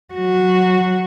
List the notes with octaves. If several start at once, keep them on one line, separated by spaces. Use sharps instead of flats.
F#3 F#4